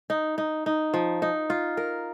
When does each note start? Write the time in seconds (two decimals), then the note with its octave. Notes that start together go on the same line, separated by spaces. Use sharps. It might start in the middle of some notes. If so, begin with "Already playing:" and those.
0.10 D#4
0.38 D#4
0.66 D#4
0.94 F3
1.22 D#4
1.50 F4
1.77 A#4